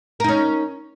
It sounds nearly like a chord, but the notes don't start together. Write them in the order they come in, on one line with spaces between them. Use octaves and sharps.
A#4 D#4 C#4